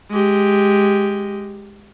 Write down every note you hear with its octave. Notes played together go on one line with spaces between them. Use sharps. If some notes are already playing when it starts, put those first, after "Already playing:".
G#3 G4